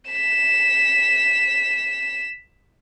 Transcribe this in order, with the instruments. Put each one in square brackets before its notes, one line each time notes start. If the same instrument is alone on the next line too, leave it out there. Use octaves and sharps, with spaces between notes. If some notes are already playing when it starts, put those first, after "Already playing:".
[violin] B6 E7